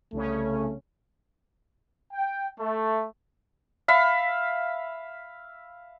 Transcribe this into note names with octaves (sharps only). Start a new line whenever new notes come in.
C2 C#3 A3 C#4
G5
A3
E5 F5 B5